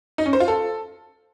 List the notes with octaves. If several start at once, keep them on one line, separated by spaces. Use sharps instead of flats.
D#4
C#4
C5
F4
A4